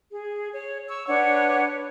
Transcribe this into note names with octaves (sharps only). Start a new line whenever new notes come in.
G#4
C#5
C#6 E6
D4 B4 C#5 F#5